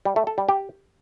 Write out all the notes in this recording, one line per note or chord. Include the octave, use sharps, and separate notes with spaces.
G3
A3
A4
G3
G4